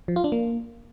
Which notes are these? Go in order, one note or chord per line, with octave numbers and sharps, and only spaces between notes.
F3
F4
D4
A#3